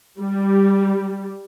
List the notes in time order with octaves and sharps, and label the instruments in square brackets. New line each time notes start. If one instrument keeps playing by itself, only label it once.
[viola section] G3